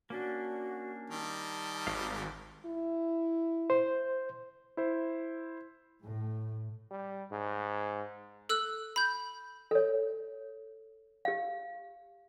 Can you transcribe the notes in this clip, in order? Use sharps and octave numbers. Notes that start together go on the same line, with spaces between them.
A#3 C#4 D4 F#4
D#3 G3 A5
G#1 F5 F#5
E4
C5
E4 C5
A2
G3
G#2
A4 E6 F#6
B5 G6
A4 C#5
G4 F5